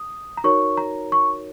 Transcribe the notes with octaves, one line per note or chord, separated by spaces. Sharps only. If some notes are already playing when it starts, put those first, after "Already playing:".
Already playing: D#6
A#5
D#4 F#4 A#4 C#5 C#6
A#5
C#6